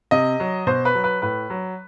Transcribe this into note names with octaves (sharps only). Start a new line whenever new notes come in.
C3 D#5
F#3
B2 C5
B4
F#3
B4
A2 B4
F#3